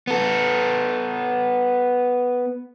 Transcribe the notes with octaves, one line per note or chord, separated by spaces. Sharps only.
B3 A4